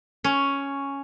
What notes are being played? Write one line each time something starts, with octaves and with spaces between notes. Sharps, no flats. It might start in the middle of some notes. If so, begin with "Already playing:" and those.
C#4